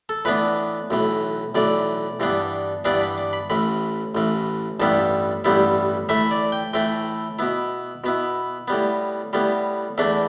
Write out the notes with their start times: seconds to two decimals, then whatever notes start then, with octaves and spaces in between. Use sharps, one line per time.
0.09 A4
0.25 A2 E3 B3 D4 B4
0.90 B1 A2 E3
1.55 B1 A2 E3 D5
2.20 G2 E3 B3 D4
2.85 G2 E3 B3 D4 D5
3.01 B5
3.18 D6
3.33 B5
3.50 A1 A2 E3 B5
4.15 A1 A2 E3
4.80 A1 G2 G3 B3 E4 A5
5.44 A1 G2 G3 B3 E4
6.09 A2 E3 A3 E4 E5
6.31 D5
6.52 G5
6.73 A2 E3 A3 E4 G5
7.39 B2 B3 E4
8.04 B2 B3 E4
8.68 A2 G3 B3
9.33 A2 G3 B3
9.98 E2 E3 A3 D4 E4